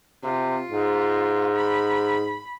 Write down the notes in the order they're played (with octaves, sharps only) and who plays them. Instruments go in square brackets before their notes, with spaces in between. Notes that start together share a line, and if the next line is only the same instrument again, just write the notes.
[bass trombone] C3 [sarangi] F4
[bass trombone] G#2
[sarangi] B5